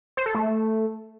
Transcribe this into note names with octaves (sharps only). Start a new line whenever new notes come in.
C5
A4
A3